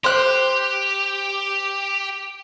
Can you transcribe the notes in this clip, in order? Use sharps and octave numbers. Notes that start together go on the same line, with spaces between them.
G4 C5 F#6